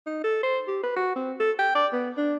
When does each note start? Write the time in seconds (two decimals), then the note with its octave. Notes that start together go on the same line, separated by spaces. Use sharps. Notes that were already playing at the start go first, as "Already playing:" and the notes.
0.07 D#4
0.24 A4
0.43 C5
0.68 G4
0.83 B4
0.96 F#4
1.16 C4
1.40 A4
1.59 G5
1.75 D5
1.93 B3
2.17 D4